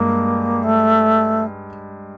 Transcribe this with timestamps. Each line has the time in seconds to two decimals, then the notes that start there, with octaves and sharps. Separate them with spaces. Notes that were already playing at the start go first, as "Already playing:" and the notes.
Already playing: G2 G#3 A#3
0.64 A3